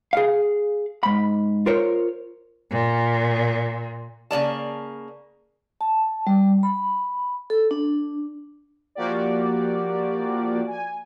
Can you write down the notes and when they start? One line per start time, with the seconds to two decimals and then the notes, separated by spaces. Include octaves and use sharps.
0.13 G#4 F5
1.03 G#2 B5
1.66 F4 A#4 C5 C#5
2.71 A#2
4.31 C#3 A#3 D5 A5
5.81 A5
6.27 G3
6.63 B5
7.50 A4
7.71 D4
8.95 F3 A#3 F#4 G4 D5
10.67 G#5